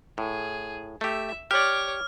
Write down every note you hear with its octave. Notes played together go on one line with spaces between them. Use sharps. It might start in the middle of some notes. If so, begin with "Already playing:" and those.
A2 G#4
A3 G4 E5
G4 C#5 D5 D6 F6